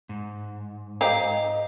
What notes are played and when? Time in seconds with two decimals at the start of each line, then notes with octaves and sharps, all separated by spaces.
0.09 G#2
1.01 D#4 G4 C5 D#5 F5 A#5